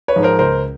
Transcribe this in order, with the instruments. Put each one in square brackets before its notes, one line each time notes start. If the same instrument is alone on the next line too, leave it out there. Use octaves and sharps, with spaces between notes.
[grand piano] B4 C#5
G#2 F3
A#4 C5
C#2 A#4 C5